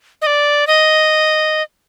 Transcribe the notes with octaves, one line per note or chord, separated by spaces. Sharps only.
D#5
D5
D#5